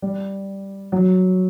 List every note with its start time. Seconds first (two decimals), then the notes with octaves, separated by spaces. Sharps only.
0.02 G3
0.92 F#3